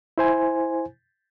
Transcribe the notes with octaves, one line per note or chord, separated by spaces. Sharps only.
E4 C5 G#5